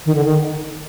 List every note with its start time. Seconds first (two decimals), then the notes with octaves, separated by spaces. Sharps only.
0.06 D#3
0.15 D3
0.25 D#3